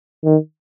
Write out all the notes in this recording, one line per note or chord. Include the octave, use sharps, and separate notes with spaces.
D#3